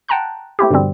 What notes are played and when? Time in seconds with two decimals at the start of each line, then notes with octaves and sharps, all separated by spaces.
0.09 F#5 G5 A5 A#5 C6 F#6
0.59 A3 C4 E4 G4
0.70 G2 B2 D3 E3 G3 C4